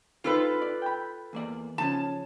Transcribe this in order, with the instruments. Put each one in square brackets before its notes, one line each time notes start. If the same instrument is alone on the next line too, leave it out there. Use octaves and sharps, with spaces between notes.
[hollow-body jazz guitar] C4 D#4 [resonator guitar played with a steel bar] F4 A4 B4
[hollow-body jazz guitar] D5
G5 B5
E2 A#3 D5
[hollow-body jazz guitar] C#3 F3 C#4 [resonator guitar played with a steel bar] A5